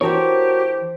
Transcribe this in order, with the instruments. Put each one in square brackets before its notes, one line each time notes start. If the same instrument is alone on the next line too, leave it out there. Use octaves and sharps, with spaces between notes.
[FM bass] E3 [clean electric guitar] F#4 A#4 C#5 [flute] G4 [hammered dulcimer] C5 A5 C6